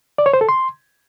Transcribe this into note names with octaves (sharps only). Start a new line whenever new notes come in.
D5
C#5
C5
A4
C6